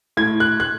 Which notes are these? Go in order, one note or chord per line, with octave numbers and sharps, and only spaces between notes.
A2 G#6
F#6
F#6